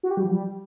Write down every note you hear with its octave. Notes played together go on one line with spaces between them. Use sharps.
F#4
G4
G3
F3
G3